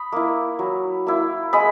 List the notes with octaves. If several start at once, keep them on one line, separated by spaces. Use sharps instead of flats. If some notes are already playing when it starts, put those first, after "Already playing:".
Already playing: B5 D#6
A#3 E4
F#3
A#3 E4
G#3 B5 D#6